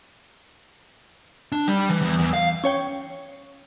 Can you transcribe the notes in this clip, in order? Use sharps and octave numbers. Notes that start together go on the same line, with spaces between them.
D4
G3
E3
E2
E2
F5
C#4 C#5 G5